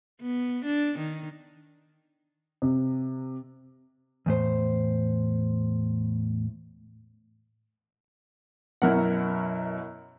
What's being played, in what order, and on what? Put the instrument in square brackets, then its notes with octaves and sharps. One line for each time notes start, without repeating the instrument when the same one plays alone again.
[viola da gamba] B3
D4
D#3
[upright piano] C3
[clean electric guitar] E2 A2 C5
[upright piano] F#2 B2 [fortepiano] E4 A#4 F#5